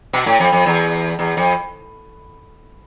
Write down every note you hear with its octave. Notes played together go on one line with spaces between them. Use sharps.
B2
A2
F2
F2
E2
E2
F2